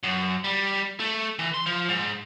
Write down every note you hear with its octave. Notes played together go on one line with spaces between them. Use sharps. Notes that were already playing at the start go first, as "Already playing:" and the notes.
F#2
G3
A3
E3
C6
F3
G#2